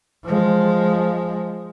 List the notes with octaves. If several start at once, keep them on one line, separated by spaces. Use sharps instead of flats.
F3 G#3